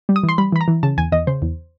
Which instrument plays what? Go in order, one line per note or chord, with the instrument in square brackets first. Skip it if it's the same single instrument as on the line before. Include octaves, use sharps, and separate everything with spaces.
[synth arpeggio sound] G3
D#6
E3
C6
G3 B5
E3 B5
A#5
E3
C#3 A5
E2 G#5
E2 D#5
C#3 C5
E2